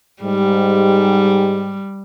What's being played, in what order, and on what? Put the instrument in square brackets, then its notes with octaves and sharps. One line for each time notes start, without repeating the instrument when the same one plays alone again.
[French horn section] G#2 G4 [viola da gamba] G3